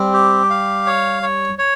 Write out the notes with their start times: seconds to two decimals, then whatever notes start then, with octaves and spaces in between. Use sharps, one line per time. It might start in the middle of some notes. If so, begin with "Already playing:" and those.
Already playing: G3 C4
0.13 G4
0.50 F5
0.86 C#5
1.23 C#5
1.59 C#5